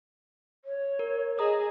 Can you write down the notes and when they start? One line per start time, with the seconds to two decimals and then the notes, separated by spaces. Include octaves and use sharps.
0.65 C#5
0.99 A#4
1.39 G#4 D#5 A#5 D#6